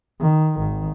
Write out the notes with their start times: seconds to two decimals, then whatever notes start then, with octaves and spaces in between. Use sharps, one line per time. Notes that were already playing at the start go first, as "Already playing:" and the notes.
0.20 D#3
0.57 G#1 D#3